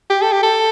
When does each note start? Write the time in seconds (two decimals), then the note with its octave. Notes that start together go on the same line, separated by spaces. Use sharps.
0.10 G4
0.22 A4
0.32 G4
0.43 A4